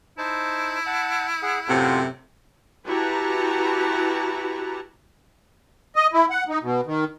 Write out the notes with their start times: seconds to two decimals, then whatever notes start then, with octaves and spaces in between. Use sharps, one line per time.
0.18 D#4 E4 C5 A5
0.86 F#5 A5
1.43 G#4 F#5
1.68 F#2 A2 C3 F4 F#5
2.84 E4 F#4 G4 B4 A5 A#5
5.96 D#5
6.13 E4
6.30 F#5
6.49 D#4
6.63 B2
6.86 D#3